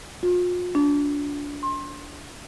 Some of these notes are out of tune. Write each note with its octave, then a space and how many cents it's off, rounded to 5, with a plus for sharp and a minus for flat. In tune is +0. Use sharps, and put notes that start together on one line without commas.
F4 +40
D4 -25
C6 +30